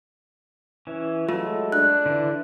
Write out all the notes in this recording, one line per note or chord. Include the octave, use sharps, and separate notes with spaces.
E3 C#4
F#3 G#3 A3 F4
D4 F#6
D3 E3